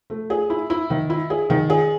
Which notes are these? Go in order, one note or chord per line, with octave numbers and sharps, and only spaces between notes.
A3
G#4
E4
E4
D#3
E4
G#4
D#3
G#4